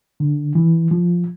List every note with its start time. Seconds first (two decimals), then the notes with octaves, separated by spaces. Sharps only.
0.20 D3
0.55 E3
0.91 F3